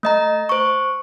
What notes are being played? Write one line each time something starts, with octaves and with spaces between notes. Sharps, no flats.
A3 D#5 A#5
C5 C#6